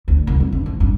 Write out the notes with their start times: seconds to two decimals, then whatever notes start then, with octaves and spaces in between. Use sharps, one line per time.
0.08 D2
0.27 C2
0.40 F1
0.52 D3
0.66 G#2
0.80 G2